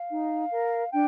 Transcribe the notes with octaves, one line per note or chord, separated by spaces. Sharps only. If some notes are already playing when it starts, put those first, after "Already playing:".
Already playing: F5
D#4
A#4
D4 G5